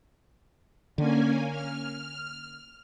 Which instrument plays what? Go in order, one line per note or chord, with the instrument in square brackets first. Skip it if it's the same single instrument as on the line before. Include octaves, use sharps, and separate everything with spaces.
[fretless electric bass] D3 [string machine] A#3 C#4 G#5
[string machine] F6